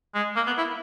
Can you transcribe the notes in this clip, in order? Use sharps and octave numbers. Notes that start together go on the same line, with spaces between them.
G#3
A#3
B3
E4